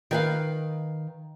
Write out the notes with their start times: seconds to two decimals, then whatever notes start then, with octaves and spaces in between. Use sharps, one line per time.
0.11 D#3 B4 F5